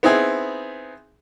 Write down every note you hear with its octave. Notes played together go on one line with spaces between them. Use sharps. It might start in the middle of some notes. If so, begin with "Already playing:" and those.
B3 C4 D#4 E4 G#4